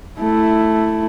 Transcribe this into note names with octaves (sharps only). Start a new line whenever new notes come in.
A3 E4